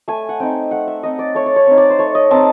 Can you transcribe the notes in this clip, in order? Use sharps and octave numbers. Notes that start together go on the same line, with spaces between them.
A3 G#5
F#5
C4 D#4 G5
A3 F#5
E5
C4 D#4 D#5
D5
A3 C#5
D5
C#5
C4 D#4
D5
C5
A3 C#5
D#5
C4 D#4 A5